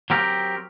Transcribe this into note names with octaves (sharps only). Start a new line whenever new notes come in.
F#3 C4 G4 A#4